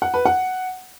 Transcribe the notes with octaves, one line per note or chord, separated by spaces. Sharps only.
F#5
B4
F#5